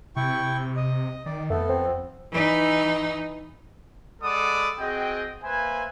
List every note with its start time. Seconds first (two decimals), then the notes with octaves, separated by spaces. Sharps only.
0.16 C3 E4 G5 C#6
0.76 D#5
1.26 D#3 D5
1.50 F2 A3 B3 A4
1.69 C4
2.32 E3 D#4
4.22 G#3 A4 D5 F#5 B5 D#6
4.79 C4 F#4 G#4 D#5 G5
5.42 A#3 B4 C5 E5 G#5